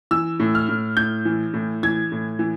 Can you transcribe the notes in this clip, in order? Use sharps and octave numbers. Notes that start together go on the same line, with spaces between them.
E3 E6
A2
F6
A2
A2 G6
E3
A2
E3 G#6
A2
E3